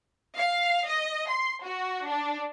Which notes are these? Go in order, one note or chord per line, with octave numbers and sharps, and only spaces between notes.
F5
D#5
C6
F#4
D4